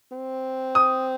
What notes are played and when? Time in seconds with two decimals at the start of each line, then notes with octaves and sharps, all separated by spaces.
0.11 C4
0.75 D#6